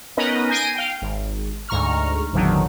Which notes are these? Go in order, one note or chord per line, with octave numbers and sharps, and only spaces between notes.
B3 C#4 D#4 A#4 B4 D#5
G#5 G6 A#6 C7 D7 D#7
F5 G5
G#1
D2 G#2 A#5 C#6 F6
G#1 E2 A#2 D3 D#3 F#3